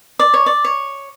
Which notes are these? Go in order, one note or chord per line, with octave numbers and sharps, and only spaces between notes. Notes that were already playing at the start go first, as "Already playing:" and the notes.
D5
C#5
D5
C#5